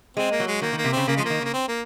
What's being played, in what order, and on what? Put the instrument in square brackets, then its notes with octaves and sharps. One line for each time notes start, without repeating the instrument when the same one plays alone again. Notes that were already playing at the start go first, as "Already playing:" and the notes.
[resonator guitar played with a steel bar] G#3 [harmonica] C4
[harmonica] A#3
[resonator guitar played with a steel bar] F#3
[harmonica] G#3
[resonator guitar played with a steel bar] D#3 [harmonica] A#3
[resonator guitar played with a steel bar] D#3 [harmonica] A#3
[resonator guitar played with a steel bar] C3
[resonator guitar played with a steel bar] C#3 [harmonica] C4
[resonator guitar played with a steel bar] C#3 [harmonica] A#3
[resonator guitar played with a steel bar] F3 [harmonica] G#3
[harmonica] A#3
[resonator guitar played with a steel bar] D#3
[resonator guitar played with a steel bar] C#3 [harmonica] A#3
[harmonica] C4
A#3